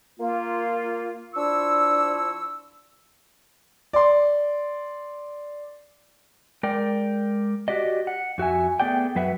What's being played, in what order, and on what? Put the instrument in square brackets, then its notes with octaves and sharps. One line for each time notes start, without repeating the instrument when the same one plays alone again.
[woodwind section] A#3 F4
F3 D4 E4 F4 C#6 E6
[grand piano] D5 C6
[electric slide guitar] G#3 A#4 D5 G5
F#4 G4 D5 D#5
F#5
F2 F#4 E5 G#5
A3 B3 G#4 D5 G5
F#2 F#3 B4 E5 F#5